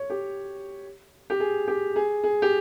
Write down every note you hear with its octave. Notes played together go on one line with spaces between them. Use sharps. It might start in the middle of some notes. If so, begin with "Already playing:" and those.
Already playing: C#5
G4
G4
G#4
G4
G#4
G#4
G4